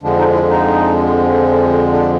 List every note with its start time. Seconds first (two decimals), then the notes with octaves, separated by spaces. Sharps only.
0.03 F2 D3 F3 G#3 D4
0.19 D#4
0.34 E4
0.50 D#4
1.92 D4